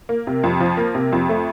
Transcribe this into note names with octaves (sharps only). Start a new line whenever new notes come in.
A#3
C3
F2
F3
A#3
C3
F2
A3